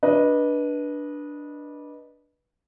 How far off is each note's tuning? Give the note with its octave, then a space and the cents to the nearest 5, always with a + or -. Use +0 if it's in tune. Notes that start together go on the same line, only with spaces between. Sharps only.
D4 +0 B4 -20 D#5 +0